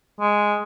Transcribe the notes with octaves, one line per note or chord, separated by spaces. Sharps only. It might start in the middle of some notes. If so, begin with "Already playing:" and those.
G#3